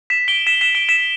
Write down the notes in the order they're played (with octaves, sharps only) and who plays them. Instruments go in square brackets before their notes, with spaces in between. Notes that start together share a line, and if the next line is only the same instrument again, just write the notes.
[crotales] B6 E7
D7 G7
B6 E7
B6 E7
D7 G7
B6 E7